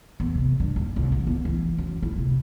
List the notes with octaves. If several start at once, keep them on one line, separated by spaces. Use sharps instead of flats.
E2
C3
G2
D#2
C2
E3
E2
E3
F#2
E4
C3